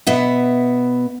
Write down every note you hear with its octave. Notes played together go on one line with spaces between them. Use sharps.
B2 B3 E5 F#5